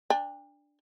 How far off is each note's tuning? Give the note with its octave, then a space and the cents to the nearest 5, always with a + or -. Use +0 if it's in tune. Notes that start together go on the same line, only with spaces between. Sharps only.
D4 +0 G5 +40